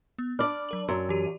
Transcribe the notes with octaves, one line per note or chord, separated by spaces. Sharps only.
B3
D4 D5 B5 D6 F6
F#3 A#4 F#7
F#2 A#5 C6 E6
E3 G4 D#7